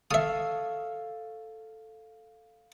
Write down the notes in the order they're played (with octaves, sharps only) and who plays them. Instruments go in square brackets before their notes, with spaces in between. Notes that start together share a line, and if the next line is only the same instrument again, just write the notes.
[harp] A4 C#5 F5 [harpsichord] E5 D#6